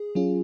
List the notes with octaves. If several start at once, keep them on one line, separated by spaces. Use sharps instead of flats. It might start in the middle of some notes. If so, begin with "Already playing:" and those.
Already playing: G#4
F#3 C#4 F4 G#4